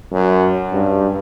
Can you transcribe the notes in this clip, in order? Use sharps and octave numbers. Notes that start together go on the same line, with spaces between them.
F#2
G2